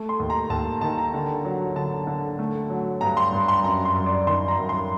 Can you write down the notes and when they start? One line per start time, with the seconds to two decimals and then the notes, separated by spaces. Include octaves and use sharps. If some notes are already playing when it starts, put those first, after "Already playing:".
Already playing: A3
0.09 C6
0.20 D#2
0.30 A#5
0.50 D#2 A5
0.81 D#3 A5
0.98 A#5
1.14 D3
1.45 F#3
1.76 D3 A5
2.07 D3
2.39 A3
2.70 F#3
3.01 G2 A#5
3.17 C6
3.32 G2
3.48 C6
3.64 F#2 A#5
3.85 C6
3.95 F#2
4.06 D5
4.27 D#3 C6
4.48 A#5
4.59 F#2
4.69 C6